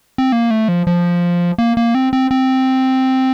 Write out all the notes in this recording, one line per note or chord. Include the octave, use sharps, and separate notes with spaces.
C4
A#3
A3
F3
F3
A#3
A#3
C4
C4
C4